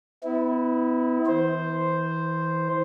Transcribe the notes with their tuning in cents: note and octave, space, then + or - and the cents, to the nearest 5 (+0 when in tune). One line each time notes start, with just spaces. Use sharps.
B3 +30 E4 -25
E3 -25 C5 +0